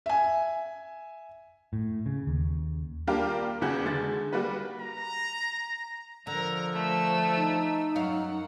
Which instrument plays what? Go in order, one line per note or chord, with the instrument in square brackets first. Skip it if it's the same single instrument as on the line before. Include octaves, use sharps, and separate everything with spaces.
[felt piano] E5 G#5
[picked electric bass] A2
C#3
D#2
[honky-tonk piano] G3 A#3 D4 F4 G4 A#4
E2 C#3 F#4 G#4 G6
D3 G#3 A6
G3 A#3 F#4 B4
[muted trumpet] A#5
[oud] D3 [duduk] F3 [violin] A#4 A#5
[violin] A3 E6
[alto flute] D#4
[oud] F#2 C#5 F5 [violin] F#5